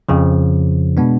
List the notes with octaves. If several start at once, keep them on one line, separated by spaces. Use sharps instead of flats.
F2 C#3 F3
B2 G#3 B3 D4